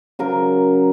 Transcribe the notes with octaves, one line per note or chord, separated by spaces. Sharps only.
C#3 F#3 A#4